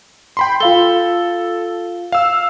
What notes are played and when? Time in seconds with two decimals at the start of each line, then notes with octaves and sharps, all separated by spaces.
0.37 G5 B5 C6
0.60 F4 A4 F5 G7
2.12 F5 E6